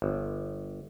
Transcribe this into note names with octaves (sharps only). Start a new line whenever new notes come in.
G1